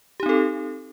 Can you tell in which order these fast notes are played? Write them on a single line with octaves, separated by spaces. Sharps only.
G4 D#4 C4 A4